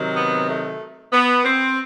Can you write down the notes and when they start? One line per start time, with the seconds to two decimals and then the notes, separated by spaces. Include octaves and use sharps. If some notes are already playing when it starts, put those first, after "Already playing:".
Already playing: C3 D#3 F#3
0.15 B3
0.48 A3
1.12 B3
1.44 C4